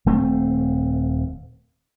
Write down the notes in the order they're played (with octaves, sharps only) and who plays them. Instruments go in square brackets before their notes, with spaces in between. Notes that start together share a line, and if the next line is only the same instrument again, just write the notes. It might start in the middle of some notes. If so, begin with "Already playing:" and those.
[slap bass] D#1 A3 B3 C4